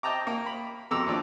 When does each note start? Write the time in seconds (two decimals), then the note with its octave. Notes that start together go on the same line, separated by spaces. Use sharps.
0.03 D#5 G5 A5 A#5 D6
0.27 A#3
0.46 B5
0.91 F2 B2 A4 A#5 D6 E6
1.06 D#2 F3 D4 D6